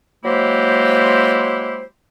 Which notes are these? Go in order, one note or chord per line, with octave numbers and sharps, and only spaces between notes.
F#3 G#3 A#3 E4 G4 C5